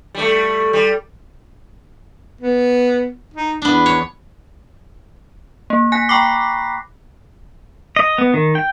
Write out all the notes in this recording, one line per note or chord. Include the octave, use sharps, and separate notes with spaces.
G3 A3
G3
B3
D#4
E2 B3 D4
C#5
A#3
G#5 F#6 A#6 B6
G5 A#5 B5 C#6 D6 C7
D#5
B3
D#3
G5